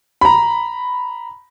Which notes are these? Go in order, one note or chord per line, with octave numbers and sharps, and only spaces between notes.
A#5 B5